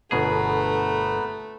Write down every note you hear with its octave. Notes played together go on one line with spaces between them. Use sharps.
G1 B2 A3 B3 G#4 A#4 B4